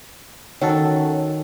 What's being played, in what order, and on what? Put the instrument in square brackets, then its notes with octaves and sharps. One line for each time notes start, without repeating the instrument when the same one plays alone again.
[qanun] D#3 [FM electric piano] C#4 F#4 A4